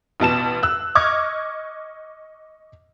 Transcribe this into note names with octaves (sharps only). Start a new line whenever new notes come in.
A1 B2 A5 E7
E6 F#6
D#5 C#6 D6 F6 G#6